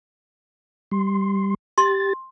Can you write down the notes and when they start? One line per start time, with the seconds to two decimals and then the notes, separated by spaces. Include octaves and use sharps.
0.91 G3 C6
1.78 G4 C6 A6